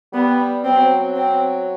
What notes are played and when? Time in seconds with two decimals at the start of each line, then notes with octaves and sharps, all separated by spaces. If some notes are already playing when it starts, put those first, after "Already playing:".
0.13 G3 B3
0.65 F#3 C4
1.15 C4